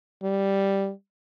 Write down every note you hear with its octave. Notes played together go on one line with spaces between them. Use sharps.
G3